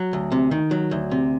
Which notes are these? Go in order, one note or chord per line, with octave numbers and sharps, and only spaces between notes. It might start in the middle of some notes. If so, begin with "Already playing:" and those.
Already playing: F#3
D2
C3
D#3
F#3
D2
C3